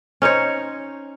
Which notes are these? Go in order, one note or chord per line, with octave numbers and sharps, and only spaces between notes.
C#4 D#4 C5 C#5